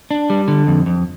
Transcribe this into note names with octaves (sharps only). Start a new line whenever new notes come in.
D4
G3
D3
F2
F2